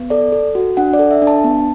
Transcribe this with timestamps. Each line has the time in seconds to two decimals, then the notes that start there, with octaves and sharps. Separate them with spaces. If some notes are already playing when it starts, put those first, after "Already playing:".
Already playing: B3
0.10 A4 D5
0.32 A4
0.55 F#4
0.77 D4 F#5
0.93 D5
0.99 A4
1.11 E5
1.22 D4
1.27 A5
1.44 B3